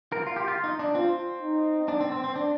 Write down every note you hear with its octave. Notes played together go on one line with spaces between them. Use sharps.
A#4
F4
G4
F4
D#4
D4
C4 F4
D#4
D4
C4
C4
C4
D4